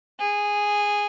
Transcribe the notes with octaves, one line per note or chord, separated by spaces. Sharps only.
G#4